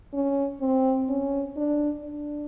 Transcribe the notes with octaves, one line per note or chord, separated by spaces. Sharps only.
C#4
C4
C#4
D4
D4